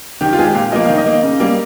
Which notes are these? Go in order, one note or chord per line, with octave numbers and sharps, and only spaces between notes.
D#3 G4
F4
G#3 G#4
G4
A#2 F5
F3 A#3 D#5
D#3 F5
D#5
A#3
C#3
G3 A#3